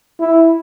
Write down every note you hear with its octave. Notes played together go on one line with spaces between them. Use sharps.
E4